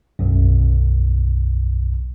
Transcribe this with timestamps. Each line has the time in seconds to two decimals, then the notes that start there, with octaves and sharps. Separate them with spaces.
0.19 B1 F#2